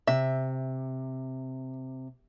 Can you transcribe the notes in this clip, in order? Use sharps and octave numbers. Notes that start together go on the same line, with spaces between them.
C3 E5